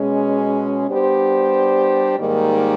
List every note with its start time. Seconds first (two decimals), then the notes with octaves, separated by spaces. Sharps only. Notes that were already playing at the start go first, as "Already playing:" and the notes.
Already playing: B2 G#3 C#4
0.87 G3 B3 D4 G4 C5
2.17 G#2 D#3 G3 A#3